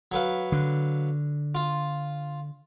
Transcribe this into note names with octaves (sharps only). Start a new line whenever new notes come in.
F#3 B4 F5
D3
F4